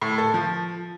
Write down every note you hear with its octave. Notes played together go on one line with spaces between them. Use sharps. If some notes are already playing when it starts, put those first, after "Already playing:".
A2
A4
F3